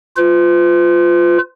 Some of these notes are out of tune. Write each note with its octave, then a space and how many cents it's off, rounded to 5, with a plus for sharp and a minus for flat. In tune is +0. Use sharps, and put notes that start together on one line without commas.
F4 +0 B4 +45